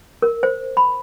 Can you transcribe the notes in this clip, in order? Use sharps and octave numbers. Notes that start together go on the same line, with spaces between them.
A#4
C5
B5